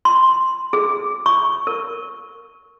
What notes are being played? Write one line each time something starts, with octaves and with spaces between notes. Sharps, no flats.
C6
G#4
C#6
A#4